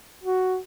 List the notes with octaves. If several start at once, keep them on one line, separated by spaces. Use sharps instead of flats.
F#4